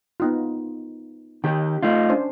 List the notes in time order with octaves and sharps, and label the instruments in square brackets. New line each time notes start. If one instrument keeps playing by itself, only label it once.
[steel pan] B3 D#4 F4
[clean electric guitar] D#3 G4 [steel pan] G5
[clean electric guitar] A3 D#4 F4
[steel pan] C#4 D4 C5